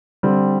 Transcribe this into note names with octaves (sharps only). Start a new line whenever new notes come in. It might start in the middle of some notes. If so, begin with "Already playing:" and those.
D3 G3 C4